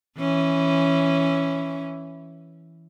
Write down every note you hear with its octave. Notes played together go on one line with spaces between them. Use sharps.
E3 C#4